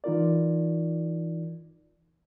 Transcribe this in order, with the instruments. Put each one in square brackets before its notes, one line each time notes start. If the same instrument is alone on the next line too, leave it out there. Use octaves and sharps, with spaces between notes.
[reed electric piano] E3 D#4 F4 A#4 D5